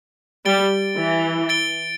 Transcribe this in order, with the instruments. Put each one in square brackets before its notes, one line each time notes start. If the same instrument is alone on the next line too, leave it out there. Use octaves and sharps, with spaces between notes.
[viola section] G3 [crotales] A6 D7 G7
[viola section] E3
[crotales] A6 D7 G7